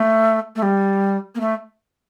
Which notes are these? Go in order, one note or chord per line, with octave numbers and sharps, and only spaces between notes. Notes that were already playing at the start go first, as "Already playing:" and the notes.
Already playing: A3
A3
G3
A#3
A3